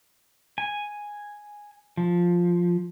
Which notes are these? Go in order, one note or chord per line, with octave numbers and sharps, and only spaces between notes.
G#5
F3